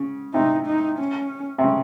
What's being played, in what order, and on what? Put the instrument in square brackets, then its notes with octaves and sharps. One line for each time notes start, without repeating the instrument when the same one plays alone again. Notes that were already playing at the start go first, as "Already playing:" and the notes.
Already playing: [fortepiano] C#3
[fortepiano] C3 [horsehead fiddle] D#4
[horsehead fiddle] D#4
C#4
[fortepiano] C3
C#3